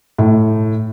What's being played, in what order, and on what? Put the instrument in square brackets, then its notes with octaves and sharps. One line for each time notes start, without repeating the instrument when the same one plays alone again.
[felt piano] A2